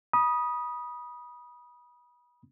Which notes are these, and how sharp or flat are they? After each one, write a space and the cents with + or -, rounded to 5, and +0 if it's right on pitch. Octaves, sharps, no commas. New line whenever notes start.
B5 -30 D#6 +0